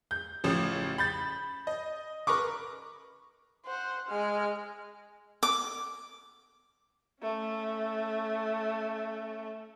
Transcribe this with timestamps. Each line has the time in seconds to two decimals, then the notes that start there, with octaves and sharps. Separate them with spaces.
0.11 G6
0.44 A1 C#3 F3
0.98 B5 G6 A6
1.67 D#5
2.27 A#4 B4 C#6 D6
3.66 C5 F#5
4.09 G#3 F6
5.43 D6
7.22 A3 C#4